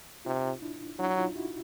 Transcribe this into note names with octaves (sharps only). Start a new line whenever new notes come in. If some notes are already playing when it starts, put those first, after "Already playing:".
C3 D#4 F4
D4 E4
F#3 D4 E4
D#4 F4
E4 F#4